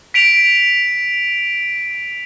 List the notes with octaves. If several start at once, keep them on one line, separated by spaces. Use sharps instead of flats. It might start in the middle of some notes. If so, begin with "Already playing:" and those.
B6 D7 F7